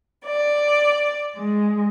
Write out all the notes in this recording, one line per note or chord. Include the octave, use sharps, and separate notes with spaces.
D5
G#3